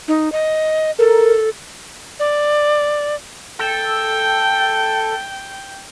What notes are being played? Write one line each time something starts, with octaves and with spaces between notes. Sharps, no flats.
D#4
D#5
A4 A#4
D5
A4 G5